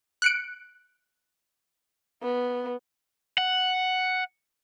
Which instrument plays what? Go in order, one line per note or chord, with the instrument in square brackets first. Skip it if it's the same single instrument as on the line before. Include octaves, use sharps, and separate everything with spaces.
[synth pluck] F#6 C#7 D7
[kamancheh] B3
[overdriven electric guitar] F#5